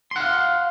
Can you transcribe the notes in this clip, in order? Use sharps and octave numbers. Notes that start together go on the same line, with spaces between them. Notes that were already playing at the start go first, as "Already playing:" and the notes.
F5 F#5 C6